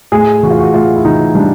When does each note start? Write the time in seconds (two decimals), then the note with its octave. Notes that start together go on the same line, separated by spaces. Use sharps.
0.12 A2 G#4
0.43 E3 F#4
0.50 F4
0.59 F#4
0.73 A2 F4
0.96 E4
1.05 E3 D#4
1.35 G3 D4